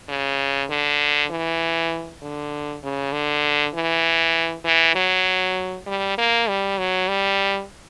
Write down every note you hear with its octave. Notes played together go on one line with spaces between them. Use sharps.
C#3
D3
E3
D3
C#3
D3
E3
E3
F#3
G3
A#3
G3
F#3
G3